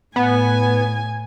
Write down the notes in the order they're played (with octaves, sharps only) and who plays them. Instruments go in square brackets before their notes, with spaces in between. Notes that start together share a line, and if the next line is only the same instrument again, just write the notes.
[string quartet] A2 G#5 [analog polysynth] B3